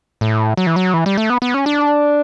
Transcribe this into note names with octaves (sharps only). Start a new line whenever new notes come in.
A2
F#3
E3
F#3
E3
G3
A3
B3
B3
C#4
D4